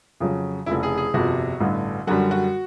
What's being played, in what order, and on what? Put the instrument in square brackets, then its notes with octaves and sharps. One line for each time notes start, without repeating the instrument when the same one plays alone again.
[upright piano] F2 C#3 F#3
[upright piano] F1 F2 C#3 [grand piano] E4
[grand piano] G#4
G#4
[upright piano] G1 F2 C3 [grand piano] F#4
[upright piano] A1 G2 D3
[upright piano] F#2 D3 G3 [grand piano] F#4
[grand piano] F#4